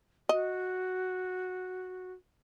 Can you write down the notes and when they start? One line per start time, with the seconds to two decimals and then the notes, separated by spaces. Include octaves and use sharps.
0.29 F#4 D#5